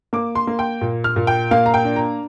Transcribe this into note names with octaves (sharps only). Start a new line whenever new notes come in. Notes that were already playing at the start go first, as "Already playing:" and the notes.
A#3 D6
C6
A#3
G5
A#2
F6
A#2
G5
A#3 F5
A#5
G5
D4
A#5